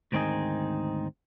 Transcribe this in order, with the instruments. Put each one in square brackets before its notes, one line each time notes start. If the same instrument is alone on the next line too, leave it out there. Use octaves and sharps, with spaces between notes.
[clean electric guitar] D2 G#2 D#3 C4 D#4 G#4